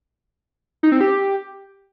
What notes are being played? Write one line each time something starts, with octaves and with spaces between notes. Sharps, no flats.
D#4
C4
G4